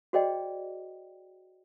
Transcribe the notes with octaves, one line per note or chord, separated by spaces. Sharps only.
F#4 G#4 C5 D5 D#5 G5